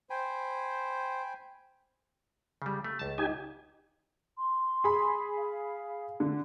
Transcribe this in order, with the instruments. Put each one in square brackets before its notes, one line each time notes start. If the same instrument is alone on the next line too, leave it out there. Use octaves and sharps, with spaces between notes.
[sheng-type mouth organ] C5 [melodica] G5 G#5 B5
[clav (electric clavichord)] C#3 G3
A3
C#2 A5
[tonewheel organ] D#4 G4 G#5
[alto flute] C6
[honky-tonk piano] G#4 B5
[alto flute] F5
[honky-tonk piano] D3